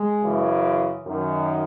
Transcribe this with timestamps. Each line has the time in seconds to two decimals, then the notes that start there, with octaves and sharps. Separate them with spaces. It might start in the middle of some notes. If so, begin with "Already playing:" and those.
Already playing: G#3
0.23 F#2 C#3 E3
1.06 F#2 D#3